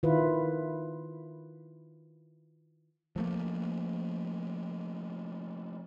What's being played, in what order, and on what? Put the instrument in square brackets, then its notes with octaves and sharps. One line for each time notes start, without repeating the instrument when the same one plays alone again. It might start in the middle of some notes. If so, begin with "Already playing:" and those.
[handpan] D#3 E4 F4 B4
[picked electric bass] F3 F#3 A3 A#3